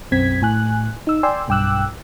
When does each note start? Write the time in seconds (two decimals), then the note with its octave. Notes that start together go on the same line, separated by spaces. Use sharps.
0.11 B1 F#2 C4 G#6 B6
0.42 A2 G#5 F#6
1.07 D#4 E6
1.23 D5 G5 G#5 C6 E6
1.48 B1 G2 G5 D6 E6 F#6